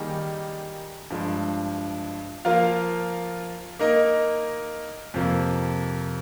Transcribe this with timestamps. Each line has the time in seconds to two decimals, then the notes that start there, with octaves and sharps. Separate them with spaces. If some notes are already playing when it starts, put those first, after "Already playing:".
Already playing: D#3 G3 A#3 D#4 G#4
1.10 G2 F3 G#3
2.45 F3 A#3 F4 A#4 F5
3.79 A#3 D#4 A#4 D#5
5.14 F2 C3 F3 A#3